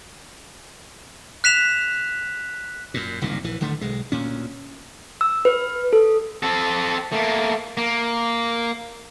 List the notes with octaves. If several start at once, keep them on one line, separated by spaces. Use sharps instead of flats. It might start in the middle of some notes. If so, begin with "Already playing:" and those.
F#6 B6 E7 F7
F#2 A#2
F#1 C2 A#2 D#3
A#1 E3
D1 D3 D#3 A3
B1 G#3
D2 A#2 C#4
E6
B4
A4
C4 A4
A3 A#3
A#3